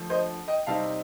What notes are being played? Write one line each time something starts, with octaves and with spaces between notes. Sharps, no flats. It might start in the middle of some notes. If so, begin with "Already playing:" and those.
Already playing: D3 F3 A3
C5 D#5
D#5 G5
C3 G3 C4 D#4 F5 A5